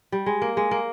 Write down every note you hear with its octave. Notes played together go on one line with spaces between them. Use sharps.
G3
G#3
A#3
G#3
A#3